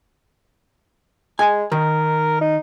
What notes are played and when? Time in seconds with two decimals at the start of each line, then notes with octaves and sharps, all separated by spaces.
1.39 G#3 G#5
1.72 D#3 A#4
2.41 D#4